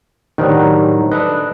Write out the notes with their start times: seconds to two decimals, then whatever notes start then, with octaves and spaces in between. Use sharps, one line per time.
0.38 A2 D#3 F#3 G3 D4 D#4 C5 A#5
1.12 D4 A4 B4 D#5 F#6